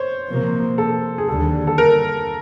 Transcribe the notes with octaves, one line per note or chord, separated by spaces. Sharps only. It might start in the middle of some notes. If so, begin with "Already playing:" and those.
Already playing: C5 C#5
C3 F3 A#3
A4
G#4
D#2 D3 G3 A4
A4
A#4